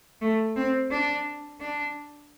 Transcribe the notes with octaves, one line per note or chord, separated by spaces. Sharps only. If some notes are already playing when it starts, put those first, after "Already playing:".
A3
C4
D4
D4